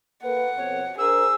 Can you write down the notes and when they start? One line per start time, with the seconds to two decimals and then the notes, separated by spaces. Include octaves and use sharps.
0.23 A#3 A4 B4 F#5
0.57 F2 B2 C4 C#5
0.98 D4 G#4 A#4 C5 E6